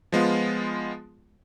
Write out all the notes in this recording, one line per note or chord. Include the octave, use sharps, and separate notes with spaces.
F3 G#3 B3 F4